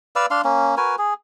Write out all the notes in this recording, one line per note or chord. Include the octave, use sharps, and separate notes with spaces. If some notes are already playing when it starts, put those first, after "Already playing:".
B4 D5 F5 E6
D4 F5 C6
A#3 C#4
F#4 A#4 B4 G#5
G#4